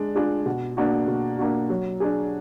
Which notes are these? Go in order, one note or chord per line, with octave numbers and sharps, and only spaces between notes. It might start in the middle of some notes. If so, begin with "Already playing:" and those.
Already playing: G#3 D4
D4 F4 G#4
B2
A#3 D4 F#4
B2
A#3 D4 F#4
F#3
D4 G#4